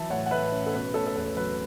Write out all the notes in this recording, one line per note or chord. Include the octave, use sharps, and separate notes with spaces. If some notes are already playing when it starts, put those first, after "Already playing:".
Already playing: E3 F#3 E5 A5
A2 C#5 F#5
F#5
A2 B4 E5
C#4
A4
B2 B4
A3 A4 C#5
A4
E2 B4
F#3 B4